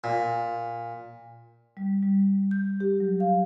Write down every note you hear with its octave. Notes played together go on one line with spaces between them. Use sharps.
A#2
G3
G3
G6
G4
F#3
F5